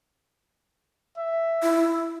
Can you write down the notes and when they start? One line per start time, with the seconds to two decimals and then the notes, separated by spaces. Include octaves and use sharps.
1.18 E5
1.62 E4